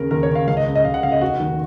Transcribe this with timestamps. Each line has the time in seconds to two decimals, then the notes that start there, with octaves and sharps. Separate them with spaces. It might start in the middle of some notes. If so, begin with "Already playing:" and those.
Already playing: D#2 C#3 A#4
0.11 D#2 A#4
0.23 C#5
0.29 C#3
0.35 F5
0.48 C#2 F5
0.57 D#5
0.66 C#3
0.75 D#5
0.85 C#2 F5
0.94 F#5
1.03 C#3 F5
1.12 D#5
1.21 F1 F#4
1.40 D#2 D#3